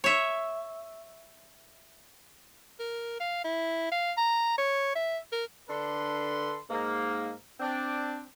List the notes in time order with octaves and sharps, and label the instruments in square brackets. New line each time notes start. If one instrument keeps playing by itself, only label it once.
[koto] C#5 E5
[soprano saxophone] A#4
F5
E4
F5
A#5
C#5
E5
A#4
[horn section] D3 D4 A4 B4 C6
G#2 A#3
C4 D4